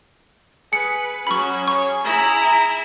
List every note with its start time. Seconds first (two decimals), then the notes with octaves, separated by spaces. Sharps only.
0.73 G#4 B4 C#7
1.27 F#3 C#4 B5 C#6
1.68 C#5 C#6
2.04 E4 A#5